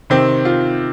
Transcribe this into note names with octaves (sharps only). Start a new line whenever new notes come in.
C3 D#3 C4
F4